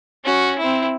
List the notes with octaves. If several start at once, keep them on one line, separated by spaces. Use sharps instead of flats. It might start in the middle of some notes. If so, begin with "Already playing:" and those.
C#4 F#4
C4 E4